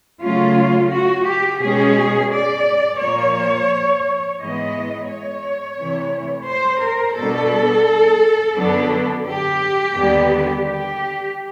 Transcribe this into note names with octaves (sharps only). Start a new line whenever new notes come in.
C#3 F#3 A3 C#4 F4
F#4
G4
B2 G#3 C#4 G#4
D5
A#2 F3 A#3 C#5
G#2 E3 G#3 B3 D#5
C#5
C3 E3 A3
C5
A#4
B2 G3 B3 D4 A4
F#2 D3 F#3 B3 D4
G4
D#2 D3 G3 B3 D4
G4